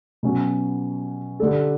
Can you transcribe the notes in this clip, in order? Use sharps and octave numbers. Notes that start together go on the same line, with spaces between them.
B2 F#3 C#4
D3 G3 D4 A4